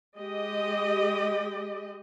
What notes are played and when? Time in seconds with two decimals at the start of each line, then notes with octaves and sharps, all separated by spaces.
0.17 G#3 G4 D#5